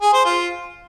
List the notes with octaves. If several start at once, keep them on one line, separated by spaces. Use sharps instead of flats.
G#4
C5
F4